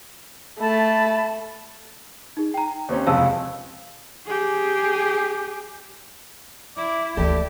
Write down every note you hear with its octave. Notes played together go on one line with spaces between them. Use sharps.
A3 A5 B5
D#4 G#4
G5 A#5
D#2 C4 C#4
F1 C#2 G#4 F5 A5 E6
G4 G#4
E4 D5
D2 E3 G4 A4 D5